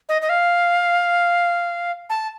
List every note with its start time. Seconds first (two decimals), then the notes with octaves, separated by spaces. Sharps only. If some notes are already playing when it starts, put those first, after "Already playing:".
0.09 D#5
0.22 D#5
0.29 F5
2.10 A5